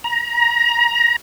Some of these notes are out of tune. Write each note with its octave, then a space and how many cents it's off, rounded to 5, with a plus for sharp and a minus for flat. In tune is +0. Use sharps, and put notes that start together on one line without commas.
A#5 +25